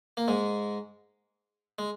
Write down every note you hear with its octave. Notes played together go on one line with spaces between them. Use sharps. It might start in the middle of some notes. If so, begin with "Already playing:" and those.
A#3
G#2 G#3
G#3